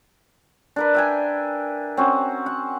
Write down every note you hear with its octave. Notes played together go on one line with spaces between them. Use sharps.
D4 A#4 B4
E5 G5 G#5
C4 C#4 F#4
F#5